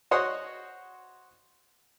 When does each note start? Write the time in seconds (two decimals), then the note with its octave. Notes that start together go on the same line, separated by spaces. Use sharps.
0.11 F#4 C5 C#5 D#5 F#5